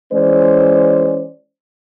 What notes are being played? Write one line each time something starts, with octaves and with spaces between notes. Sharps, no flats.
E3 G#3 C#4 C5 D5